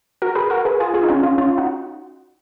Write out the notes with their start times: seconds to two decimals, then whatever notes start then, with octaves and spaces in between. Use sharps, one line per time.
0.22 F#4 A#4
0.35 G#4 B4
0.50 F#4 A#4
0.65 G#4 B4
0.80 F4 G#4
0.94 F4 G#4
1.03 D#4
1.08 C#4 F4
1.23 C#4 F4
1.38 C#4 F4
1.57 D#4 F#4